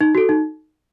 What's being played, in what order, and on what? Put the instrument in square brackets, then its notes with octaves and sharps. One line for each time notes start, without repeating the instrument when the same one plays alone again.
[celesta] D#4
F#4 A4
D#4